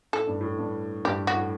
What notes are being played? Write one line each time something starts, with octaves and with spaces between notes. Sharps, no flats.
A2 A4
G2
A2
G2
G2 G4
F#4
A2